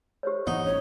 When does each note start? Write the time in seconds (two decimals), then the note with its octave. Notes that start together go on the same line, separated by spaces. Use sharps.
0.23 G4 C5 C#5
0.47 A2 E3 B3 D#4 F#5
0.65 A1 A2 C#4 C#5